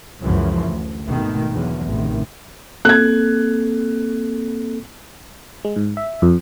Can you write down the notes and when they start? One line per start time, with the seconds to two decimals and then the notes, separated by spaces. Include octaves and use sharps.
0.22 C#2 F#2 C#3 E3 F3
0.65 D2
1.07 G#1 B2 D#3 A3
1.51 E2 D3 F#3
1.87 A1 C3 D#3
2.85 A#3 C4 A4 F#6 G#6
5.65 G#3
5.76 G#2
5.97 E5
6.22 F2